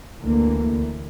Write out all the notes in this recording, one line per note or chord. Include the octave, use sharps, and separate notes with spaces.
D2 D3 E3 A3 A#3